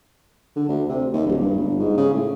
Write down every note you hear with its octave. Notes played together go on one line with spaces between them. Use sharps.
D3
D2
C3
D#2
D1
G2
G1
G#2
C#3
A2